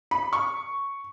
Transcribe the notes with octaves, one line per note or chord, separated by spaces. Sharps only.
B5
C#6